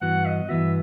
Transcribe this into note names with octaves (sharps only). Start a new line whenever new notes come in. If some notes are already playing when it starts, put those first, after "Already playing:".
G2 E3 B3 F#4 F#5
D#5
G2 E3 B3 F#4 E5